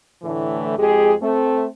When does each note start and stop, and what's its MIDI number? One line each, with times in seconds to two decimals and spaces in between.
0.22 0.73 45
0.22 0.73 50
0.22 0.73 52
0.22 0.73 57
0.77 1.13 41
0.77 1.13 56
0.77 1.13 67
0.77 1.13 68
1.21 1.66 57
1.21 1.66 60